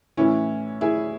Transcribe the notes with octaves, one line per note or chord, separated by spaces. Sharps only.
A2 E3 C#4 E4
E4 G#4